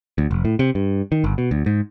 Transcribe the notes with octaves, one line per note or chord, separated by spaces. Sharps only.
D2
F1
A2
C3
G2
D#3
G1
B2
D2
G#2